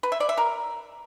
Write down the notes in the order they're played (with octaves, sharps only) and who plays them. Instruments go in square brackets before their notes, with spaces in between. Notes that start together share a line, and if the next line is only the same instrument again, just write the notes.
[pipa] B4
E5
D5
E5
A#4